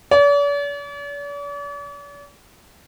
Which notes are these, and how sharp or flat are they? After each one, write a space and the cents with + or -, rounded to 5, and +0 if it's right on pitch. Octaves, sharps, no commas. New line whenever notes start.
D5 -45